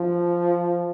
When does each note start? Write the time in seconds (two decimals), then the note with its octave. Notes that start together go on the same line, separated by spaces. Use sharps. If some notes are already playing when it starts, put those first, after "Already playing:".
Already playing: F3